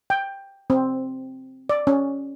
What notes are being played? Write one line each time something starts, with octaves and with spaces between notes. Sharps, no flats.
G5
C4
D5
C#4